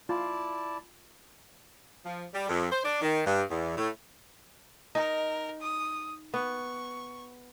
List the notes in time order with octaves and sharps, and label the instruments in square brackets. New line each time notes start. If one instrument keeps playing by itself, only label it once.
[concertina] E4 D5 A5 [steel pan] F4
[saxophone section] F3
G3
F2
C5
D4
D#3
G2
E2
A2
[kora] D#4 [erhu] A#4
[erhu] D#6
[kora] B3 [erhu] C#6